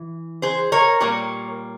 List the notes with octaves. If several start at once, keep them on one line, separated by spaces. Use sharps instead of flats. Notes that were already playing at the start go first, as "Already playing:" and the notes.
Already playing: E3
G#4 C5
A#4 C#5
A#2 G3 A#3 A#4 C#5